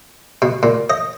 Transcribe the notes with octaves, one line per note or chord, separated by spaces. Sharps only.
B2
A#2
D#5